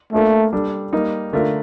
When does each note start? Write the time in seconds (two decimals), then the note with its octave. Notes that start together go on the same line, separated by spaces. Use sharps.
0.12 A3 A#3 D4 F4 A4
0.53 G3 D4 A4
0.93 G3 A#3 D#4
1.33 D3 A3 D4 F4 A#4